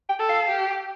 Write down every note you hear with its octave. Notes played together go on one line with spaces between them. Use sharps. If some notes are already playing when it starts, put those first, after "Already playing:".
G5
A4
F5
G4